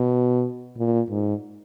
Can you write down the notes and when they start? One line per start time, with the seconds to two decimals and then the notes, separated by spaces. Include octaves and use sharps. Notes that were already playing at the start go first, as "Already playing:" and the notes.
Already playing: B2
0.77 A#2
1.10 G#2